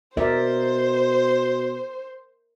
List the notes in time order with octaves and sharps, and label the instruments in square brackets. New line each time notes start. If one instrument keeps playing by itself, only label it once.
[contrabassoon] B2 [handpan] A#4 D5 E5 [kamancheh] C5